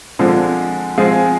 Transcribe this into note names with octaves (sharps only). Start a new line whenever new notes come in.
D3 F3 G#3 C4
F3 G#3 C4 F4 G#4